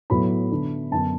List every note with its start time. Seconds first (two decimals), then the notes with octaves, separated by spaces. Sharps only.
0.10 A2 F#3 B3 B5
0.51 D3 B3 D4
0.91 F#2 D3 B3 D4 A5